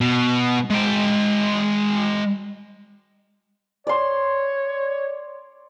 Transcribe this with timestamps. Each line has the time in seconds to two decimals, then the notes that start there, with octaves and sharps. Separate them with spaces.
0.01 B2
0.70 G#3 G5
3.87 C#5 D5 C6